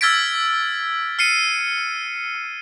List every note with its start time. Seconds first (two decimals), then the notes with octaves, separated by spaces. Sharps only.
0.01 E6 F6 G#6 A6 B6 D7
1.19 F6 C7 C#7 D#7